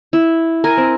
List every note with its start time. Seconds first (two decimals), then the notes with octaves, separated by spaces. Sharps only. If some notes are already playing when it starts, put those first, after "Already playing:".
0.13 E4
0.64 A#4 G#5
0.77 C4